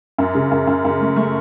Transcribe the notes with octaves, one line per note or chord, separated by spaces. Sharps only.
F#2
C#3
F#2
F#2
F#2
A3
A3